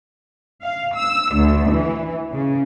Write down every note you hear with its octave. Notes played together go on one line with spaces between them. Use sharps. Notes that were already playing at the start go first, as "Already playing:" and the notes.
F5
E6
D2
E3
C#3